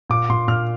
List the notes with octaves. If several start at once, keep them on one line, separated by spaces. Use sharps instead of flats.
A#2 D6
A#2 C6
A#2 F6